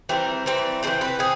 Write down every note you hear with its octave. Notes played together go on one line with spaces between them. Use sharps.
E3 G3 C4 A#4
E3 G3 C4
E3 G3 C4 C5
B4
C4 G#4